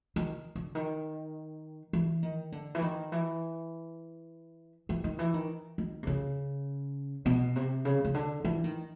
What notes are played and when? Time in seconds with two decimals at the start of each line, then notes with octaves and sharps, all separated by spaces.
0.16 D#3
0.55 D3
0.75 D#3
1.93 E3
2.23 D#3
2.52 D3
2.75 E3
2.82 D#3
3.12 E3
4.89 E3
5.04 D#3
5.19 E3
5.34 D#3
5.78 D#3
6.03 C3
6.07 C#3
7.26 B2
7.56 C3
7.85 C#3
8.05 C#3
8.14 D3
8.45 E3
8.64 D#3